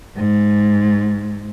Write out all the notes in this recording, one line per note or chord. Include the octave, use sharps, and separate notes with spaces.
G#2